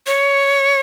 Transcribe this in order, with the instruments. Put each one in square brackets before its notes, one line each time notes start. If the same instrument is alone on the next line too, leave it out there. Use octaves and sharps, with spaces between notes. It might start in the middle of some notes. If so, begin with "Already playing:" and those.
[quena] C#5